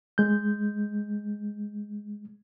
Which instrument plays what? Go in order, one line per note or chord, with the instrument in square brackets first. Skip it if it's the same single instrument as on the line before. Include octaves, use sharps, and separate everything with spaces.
[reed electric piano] G#3 G6